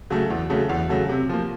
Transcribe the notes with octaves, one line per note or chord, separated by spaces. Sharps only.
C#3 F#3 A3
E2
C#3 F#3 A3
E2
C#3 F#3 A3
C3
F3 A#3